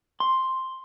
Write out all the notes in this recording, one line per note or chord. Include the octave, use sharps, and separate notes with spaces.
C6